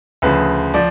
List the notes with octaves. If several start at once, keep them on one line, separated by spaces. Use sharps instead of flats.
D2 C#3 F3 B4
F3 D5